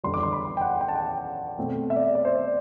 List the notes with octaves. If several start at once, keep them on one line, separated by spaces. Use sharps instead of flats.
E2 D3 G3 C6
D6
C6
B5
G5
F#5
G5
A5
G5
B2 A3 C4
E5
D5
D5
C5
D5